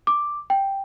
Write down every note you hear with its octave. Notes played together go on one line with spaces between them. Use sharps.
D6
G5